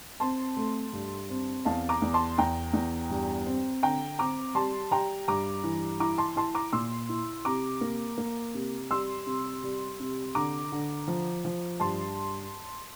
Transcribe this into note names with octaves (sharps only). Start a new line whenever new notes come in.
C4 A5 C6
A3
G2
C4
E2 F5 A5
A#5 D6
E2
A5 C6
E2 G5 A#5
E2
G2
C4
D3 G5 A#5
C4 A#5 D6
G3 A5 C6
G3 G5 A#5
G2 A#5 D6
E3
E4 A#5 D6
A5 C6
E4 A5 C6
A#5 D6
A#2 C6 E6
E4
C3 A#5 D6
A#3
A#3
C3
G3 C6 E6
C3
G3
C3
D3 A#5 D6
D3
F3
F3
G2 A5 C6